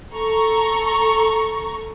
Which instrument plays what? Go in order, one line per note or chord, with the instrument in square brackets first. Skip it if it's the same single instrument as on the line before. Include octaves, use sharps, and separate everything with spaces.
[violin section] A4 A#5 C#6